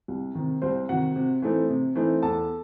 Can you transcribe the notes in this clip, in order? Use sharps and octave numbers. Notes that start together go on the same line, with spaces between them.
C2
C3 D#3
C2 C4 C5
C3 D#3 F#4 F#5
C3
E3 A3 C4 D#4
C3
E3 A3 C4 D#4
E2 A4 A5